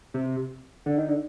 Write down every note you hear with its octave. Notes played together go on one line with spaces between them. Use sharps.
C3
D3
D#3
D3